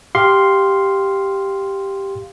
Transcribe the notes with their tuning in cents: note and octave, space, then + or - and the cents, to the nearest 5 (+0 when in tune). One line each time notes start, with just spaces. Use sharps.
G4 +0 F5 +0 C6 +0